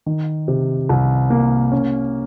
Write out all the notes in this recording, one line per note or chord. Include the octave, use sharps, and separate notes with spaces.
D#3
C3
C2
A#3
C#4